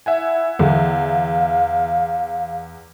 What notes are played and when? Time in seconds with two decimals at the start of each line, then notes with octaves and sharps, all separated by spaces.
0.06 E4 E5 F#5 G#5
0.59 E2 D3 F5